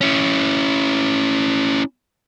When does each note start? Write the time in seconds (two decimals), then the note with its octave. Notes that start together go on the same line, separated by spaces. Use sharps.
0.01 C#4 E4